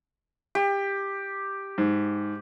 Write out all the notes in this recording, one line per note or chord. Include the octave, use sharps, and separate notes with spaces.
G4
G#2